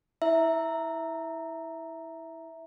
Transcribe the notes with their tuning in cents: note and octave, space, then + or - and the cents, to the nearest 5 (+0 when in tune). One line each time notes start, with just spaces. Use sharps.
E4 -20 E5 +0 A#5 +0